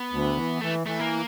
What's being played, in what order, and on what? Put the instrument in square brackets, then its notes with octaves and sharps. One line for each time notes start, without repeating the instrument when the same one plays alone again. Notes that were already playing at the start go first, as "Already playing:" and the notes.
Already playing: [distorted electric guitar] B3
[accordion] D2
E3
[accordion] E3 [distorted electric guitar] A3
[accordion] E3 [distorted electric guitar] A3
[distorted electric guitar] A#3